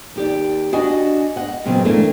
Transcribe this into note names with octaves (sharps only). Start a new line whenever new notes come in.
D#2 G4 D5
D4 F#4 D#5 F#5 G#5
D#5 F#5
A#2 C#3 F#3 B3 C4
E3 A3 A#3 D4